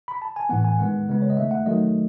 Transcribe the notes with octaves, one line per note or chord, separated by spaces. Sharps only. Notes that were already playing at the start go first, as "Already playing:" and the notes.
B5
A5
G#5
A2 E3 B3 F#5
G#5
D#3 G#3 B3 F#5
C#3 G#3 B3
C#5
D#5
D#3 A3 E5
F#5
D#3 F#3 A3 D#5